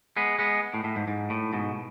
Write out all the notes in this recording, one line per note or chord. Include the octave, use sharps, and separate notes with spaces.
G#3 B3
G#3 B3
A2
A2
G#2
G#2
A2
G#2 B2